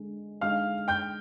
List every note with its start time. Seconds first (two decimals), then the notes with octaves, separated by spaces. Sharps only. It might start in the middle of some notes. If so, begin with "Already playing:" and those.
Already playing: D3 G#3
0.41 D3 G#3 D#4 F5 F6
0.88 G5 G6